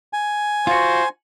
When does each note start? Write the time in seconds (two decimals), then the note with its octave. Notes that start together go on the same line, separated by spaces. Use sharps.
0.13 G#5
0.67 F4 F#4 C5